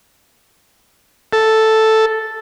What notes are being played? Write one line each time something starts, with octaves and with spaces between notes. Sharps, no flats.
A4